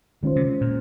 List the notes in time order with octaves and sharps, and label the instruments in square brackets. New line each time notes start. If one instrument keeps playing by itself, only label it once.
[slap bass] D#3 [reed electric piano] G#3 C#4 F4 C5
[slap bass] C3
A#2